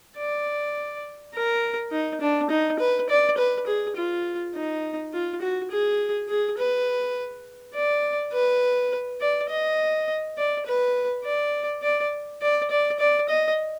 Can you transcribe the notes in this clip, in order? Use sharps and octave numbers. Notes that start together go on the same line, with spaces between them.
D5
A#4
D#4
D4
D#4
B4
D5
B4
G#4
F4
D#4
F4
F#4
G#4
G#4
B4
D5
B4
D5
D#5
D5
B4
D5
D5
D5
D5
D5
D#5